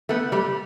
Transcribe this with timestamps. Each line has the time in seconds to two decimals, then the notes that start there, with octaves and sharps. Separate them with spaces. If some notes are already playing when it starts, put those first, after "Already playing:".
0.09 A3 B3
0.32 G3 A3